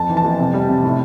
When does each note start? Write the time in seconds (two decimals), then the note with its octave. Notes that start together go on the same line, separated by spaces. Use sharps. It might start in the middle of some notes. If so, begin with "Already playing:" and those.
Already playing: F2 A5
0.09 E3
0.17 A5
0.24 F2
0.39 C3
0.53 G3
0.69 C3
0.84 A2